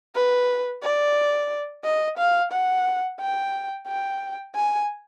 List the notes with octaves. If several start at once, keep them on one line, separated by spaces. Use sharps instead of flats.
B4
D5
D#5
F5
F#5
G5
G5
G#5